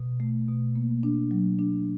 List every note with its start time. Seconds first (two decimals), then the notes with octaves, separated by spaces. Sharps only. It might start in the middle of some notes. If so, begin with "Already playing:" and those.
Already playing: B2
0.20 A3
0.48 B2
0.76 A#3
1.03 D4
1.31 F#3
1.59 D4